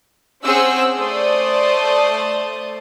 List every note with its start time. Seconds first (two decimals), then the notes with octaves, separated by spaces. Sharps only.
0.43 C4 C#4 G#4 F#5 E6
0.97 A3 C5 D5 A5 D#6